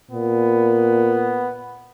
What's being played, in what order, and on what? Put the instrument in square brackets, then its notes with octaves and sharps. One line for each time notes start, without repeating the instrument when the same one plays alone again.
[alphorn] A#2 [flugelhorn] B3